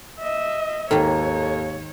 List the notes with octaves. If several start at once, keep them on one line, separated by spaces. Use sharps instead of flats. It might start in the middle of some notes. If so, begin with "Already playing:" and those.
D#5 E5
D#2 G#2 D#3 A4 C#5